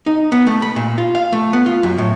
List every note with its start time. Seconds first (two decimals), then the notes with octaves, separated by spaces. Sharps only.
0.06 D#4
0.32 B3
0.47 A3
0.62 B5
0.76 A#2
0.98 F4
1.15 F5
1.32 A3
1.53 B3
1.66 F4
1.83 F#2
1.98 A2